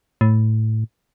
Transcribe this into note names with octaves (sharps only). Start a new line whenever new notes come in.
A2